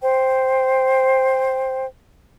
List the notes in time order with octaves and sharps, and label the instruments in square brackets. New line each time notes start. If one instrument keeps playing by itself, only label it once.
[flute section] C5 G5